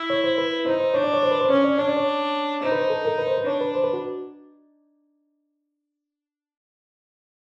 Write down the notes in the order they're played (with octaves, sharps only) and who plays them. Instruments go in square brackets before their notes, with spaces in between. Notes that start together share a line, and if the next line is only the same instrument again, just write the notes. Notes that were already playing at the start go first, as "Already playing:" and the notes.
Already playing: [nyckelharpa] E4
[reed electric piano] C#5
C5
B4
[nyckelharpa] D#4 [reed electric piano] C5
[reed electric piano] C5
[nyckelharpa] D4 [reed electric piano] C#5
[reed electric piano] D5
C#5
C5
B4
C5
[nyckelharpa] C#4 [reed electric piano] C#5
[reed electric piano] D5
[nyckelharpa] D4 [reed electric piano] C#5
[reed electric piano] D5
C#5
[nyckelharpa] D#4 [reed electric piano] C5
[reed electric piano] B4
C5
A4
A#4
B4
C5
B4
[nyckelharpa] D4 [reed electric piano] C#5
[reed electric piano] B4
C5
B4
F#4